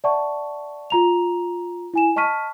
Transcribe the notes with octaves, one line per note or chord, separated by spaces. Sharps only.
D5 E5 F#5 A5 C#6
F4 A#5 F7
E4 G#5 E7
D#5 A5 C#6 F6 B6 D#7